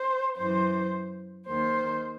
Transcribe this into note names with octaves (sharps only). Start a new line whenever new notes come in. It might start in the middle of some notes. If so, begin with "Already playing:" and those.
Already playing: C5
F#2 E3 C5
D#2 D#3 C5